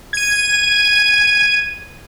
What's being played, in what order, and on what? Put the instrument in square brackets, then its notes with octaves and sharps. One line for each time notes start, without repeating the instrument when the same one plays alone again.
[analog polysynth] G#6 D#7